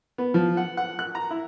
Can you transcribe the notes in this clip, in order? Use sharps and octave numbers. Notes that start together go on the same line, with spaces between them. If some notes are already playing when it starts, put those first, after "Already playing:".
B3
F3
F#5
F#5
F#6
A#5
E4